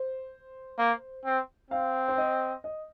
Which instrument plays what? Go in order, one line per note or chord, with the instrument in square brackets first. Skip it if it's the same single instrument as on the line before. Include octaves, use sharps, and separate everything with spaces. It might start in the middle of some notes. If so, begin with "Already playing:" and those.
Already playing: [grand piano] C5
[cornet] A#3
C4
[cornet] C4 [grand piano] F5
[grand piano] C5
D#5
D#5